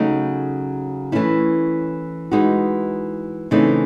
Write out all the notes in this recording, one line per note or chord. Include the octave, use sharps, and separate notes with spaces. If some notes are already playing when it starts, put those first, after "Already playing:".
Already playing: C#3 F#3 A3 D#4
E3 A3 C#4 E4
E3 G#3 D#4 F#4
C#3 E3 A3 C4 D#4